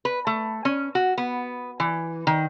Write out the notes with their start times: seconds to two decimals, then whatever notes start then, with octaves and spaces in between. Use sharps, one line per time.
0.05 B4
0.27 A3
0.65 C#4
0.95 F#4
1.18 B3
1.80 E3
2.27 D#3